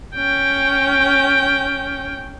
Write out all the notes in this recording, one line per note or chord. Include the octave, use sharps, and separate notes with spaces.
C#4 G5